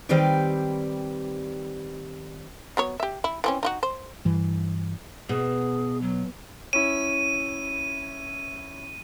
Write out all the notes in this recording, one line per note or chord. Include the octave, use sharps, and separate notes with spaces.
D#3 G3 C4 G4 B4 D5
F#3 B3 C#5
G4 E5
E4
E3 C4 C#4
D#4 F4 F#4
C5
G2 E3
B2 G#4
F#3
C#4 E4 D#7